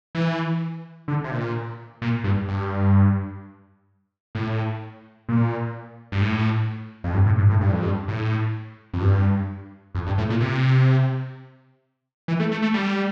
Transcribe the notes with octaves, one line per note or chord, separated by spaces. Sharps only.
E3
D3
C3
A#2
A#2
G2
G2
A2
A#2
G2
A2
F2
G2
A2
G2
A2
G2
F2
G2
A2
F2
G2
F2
G2
A2
A#2
C3
E3
A3
A3
A3
G3